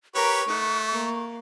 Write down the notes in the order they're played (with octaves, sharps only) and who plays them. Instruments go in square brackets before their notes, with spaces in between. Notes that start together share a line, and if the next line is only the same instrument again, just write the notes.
[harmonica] G4 B4 C#5 [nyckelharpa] A#4 A#5 [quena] C#6
[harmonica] A3 [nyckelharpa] D#4 F#5
[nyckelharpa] A#3